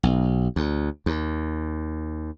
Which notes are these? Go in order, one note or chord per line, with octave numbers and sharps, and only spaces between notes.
B1
D2
D#2